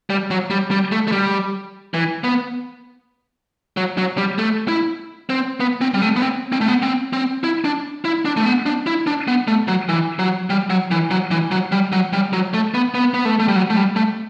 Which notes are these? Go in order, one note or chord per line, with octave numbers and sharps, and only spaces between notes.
G3
F#3
G3
G3
A3
A3
G3
E3
B3
F#3
F#3
G3
A3
E4
C4
B3
C4
G3
A3
B3
C4
C4
A3
B3
C4
C4
E4
D4
E4
D4
A3
B3
D4
E4
D4
B3
A3
F#3
E3
F#3
G3
F#3
E3
F#3
E3
F#3
G3
F#3
G3
F#3
A3
B3
B3
B3
A3
A3
G3
F#3
A3
G3
A3